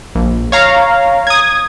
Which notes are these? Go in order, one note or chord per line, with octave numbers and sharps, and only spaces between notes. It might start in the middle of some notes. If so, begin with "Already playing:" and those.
A#1
C#5 F5 A#5
D#6 G#6